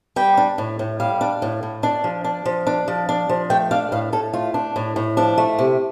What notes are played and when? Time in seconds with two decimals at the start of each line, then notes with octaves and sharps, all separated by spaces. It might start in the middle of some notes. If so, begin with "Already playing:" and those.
0.16 G3 G5
0.37 D4
0.58 A2
0.79 A2
1.00 G3 F5
1.21 D4
1.42 A2
1.63 A2
1.83 D4
2.04 F3
2.24 D4
2.45 F3
2.67 D4
2.88 F3
3.09 D4
3.29 F3
3.50 A3 G5
3.71 D4 F5
3.92 A2 F5
4.13 A2 A4
4.33 A3 F4
4.54 D4
4.76 A2
4.96 A2
5.17 F3 D4
5.38 A3
5.59 C3